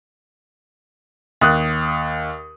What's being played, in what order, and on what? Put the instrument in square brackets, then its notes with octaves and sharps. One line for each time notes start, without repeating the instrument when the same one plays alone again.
[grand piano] D#2 D#6 F#6